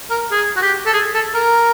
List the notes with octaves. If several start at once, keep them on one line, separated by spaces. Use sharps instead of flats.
A#4
G#4
F#4
G4
A4
G#4
A4
A#4